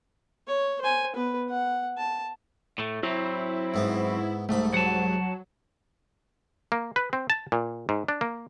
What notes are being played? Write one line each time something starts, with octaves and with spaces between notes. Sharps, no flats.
C#5
C5 G#5
B3 B4
F#5
A5
A2 A3
F#3 C4 E4
G#2 B3
C2 G#2 A3 B5
F#3 F#5 A5
A#3
B4
C4
A5
A#2
G#2
D4
A#3